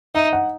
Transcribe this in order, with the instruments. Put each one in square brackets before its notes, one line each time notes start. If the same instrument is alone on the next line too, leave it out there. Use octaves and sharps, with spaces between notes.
[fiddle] D#4 [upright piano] E5
[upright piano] F#5